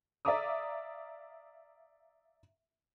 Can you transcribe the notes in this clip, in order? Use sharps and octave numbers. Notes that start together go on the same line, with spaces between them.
D5 E5 F5 A#5 D6 D#6